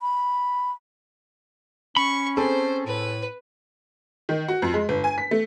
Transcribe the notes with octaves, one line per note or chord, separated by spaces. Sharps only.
B5
C#4 B5 C#6
C4 G#4 A4 C5
A2 B4
D#3
F#4
F2
G#3
G1
G#5
B6
A3